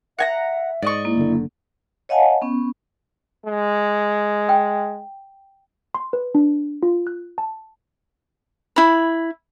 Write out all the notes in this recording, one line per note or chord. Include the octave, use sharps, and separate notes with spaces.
E5 F#5 G#5 A#5
G#2 D5 D#5 C#6
A#3 E4
F#1 D3
C#5 D#5 F5 F#5 G#5 A5
B3 C#4
G#3
G5
C6
B4
D4
F4
F#6
A5
E4 B5